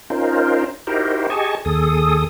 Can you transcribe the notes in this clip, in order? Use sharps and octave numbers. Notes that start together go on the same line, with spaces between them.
C#4 D#4 F4 A#4 C5
D#4 E4 F#4 G4 A#4 C5
G4 G#4 D#5 G#5 A5 C#6
D#2 G#4 A4 D#6